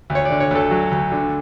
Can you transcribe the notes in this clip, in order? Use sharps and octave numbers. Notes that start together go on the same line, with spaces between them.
D2
C#5
D5
D3
C#5
D2 A4
F#3
D2
D3